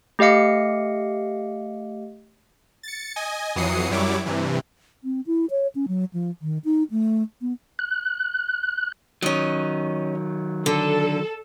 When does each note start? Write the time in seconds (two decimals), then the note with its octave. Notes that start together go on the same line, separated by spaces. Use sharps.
0.19 A3 G4 D#5 F5 C#7
2.83 A6 C#7
3.16 D#5 G#5
3.56 F2 E3 F#3 D#6 C7 C#7
3.90 F#2 F#3 G3 E4 C#5 D6
4.26 G2 C3 E3
5.04 C4
5.27 E4
5.50 C#5
5.75 C#4
5.88 F#3
6.13 F3
6.42 D#3
6.65 D#4
6.91 A3
7.41 B3
7.79 F#6
9.22 D#3 F#3 C#4 D#5
10.66 D3 A4